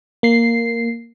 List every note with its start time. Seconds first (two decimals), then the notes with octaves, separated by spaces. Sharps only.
0.23 A#3 C7